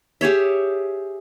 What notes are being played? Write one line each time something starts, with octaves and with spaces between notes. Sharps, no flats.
G4 G#4 C#5 E5